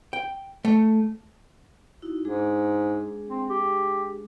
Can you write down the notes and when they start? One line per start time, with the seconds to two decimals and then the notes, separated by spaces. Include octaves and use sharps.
0.13 G5
0.65 A3
2.02 D#4 E4 F#4
2.25 G#2 G#3 D4 G#4
3.28 C4
3.49 G4